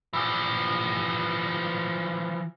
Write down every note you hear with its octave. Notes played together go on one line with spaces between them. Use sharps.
E3 F3